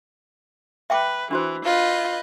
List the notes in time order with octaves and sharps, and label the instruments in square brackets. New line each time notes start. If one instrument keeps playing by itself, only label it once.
[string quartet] B4 [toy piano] E5 G5 D6
[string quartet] E3 [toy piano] D4 F#4 C5
[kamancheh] F4 [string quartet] B4 D#5 G6